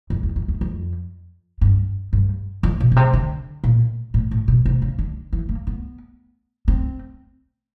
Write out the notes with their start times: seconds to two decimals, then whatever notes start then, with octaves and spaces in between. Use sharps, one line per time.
0.10 F2
0.23 E2
0.36 F2
0.48 E2
0.61 F2
1.61 G2
2.13 G2
2.63 F2
2.80 B2
2.92 B2
2.96 C3
3.13 D3
3.64 A#2
4.14 A2
4.31 A2
4.48 B2
4.66 C3
4.82 C#3
4.99 D3
5.33 E3
5.49 A#3
5.67 B3
6.68 C4